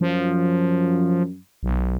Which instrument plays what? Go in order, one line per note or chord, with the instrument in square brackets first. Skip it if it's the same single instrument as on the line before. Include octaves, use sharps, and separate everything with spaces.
[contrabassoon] F#2 [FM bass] F3
[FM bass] B1